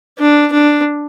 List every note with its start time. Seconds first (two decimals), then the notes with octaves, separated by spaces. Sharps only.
0.18 D4
0.52 D4